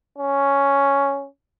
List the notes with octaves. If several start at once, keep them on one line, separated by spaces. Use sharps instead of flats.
C#4